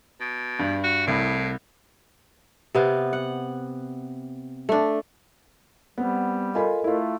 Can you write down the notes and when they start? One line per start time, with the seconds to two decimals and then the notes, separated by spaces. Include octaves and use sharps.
0.20 B2
0.59 G2
0.84 F#4
1.07 C2 A2
2.75 C3 B3 F5
3.13 F#5
4.69 A3 D4
5.98 G3 B3 C4 F#5
6.55 F4 A4 A#4 D#5 G#5 B5
6.84 A3 E4 F4